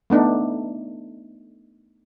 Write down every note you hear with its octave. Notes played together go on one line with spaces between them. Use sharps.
A3 B3 D4 D#4